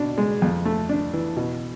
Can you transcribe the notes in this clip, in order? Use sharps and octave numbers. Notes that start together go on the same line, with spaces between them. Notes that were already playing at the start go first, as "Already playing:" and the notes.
Already playing: B2 D4
G#3
F2
A3
D4
E3
B2